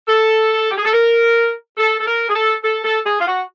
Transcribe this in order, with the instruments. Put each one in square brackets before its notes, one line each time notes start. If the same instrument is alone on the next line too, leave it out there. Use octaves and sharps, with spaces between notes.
[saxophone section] A4
G4
G#4
A4
A#4
A4
A4
A#4
G#4
A4
A4
A4
G#4
F4
F#4